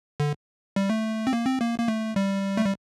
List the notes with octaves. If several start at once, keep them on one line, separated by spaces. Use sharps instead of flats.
D3
G3
A3
C4
A#3
C4
A#3
A#3
A3
G3
A3
G3